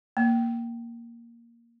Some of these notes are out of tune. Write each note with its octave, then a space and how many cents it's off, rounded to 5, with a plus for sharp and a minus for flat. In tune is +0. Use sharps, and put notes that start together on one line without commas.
A#3 +0